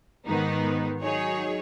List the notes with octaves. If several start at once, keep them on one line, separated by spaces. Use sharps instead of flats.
G#2 D#3 B3 D#4
D#3 F#3 D#4 G#4 C#5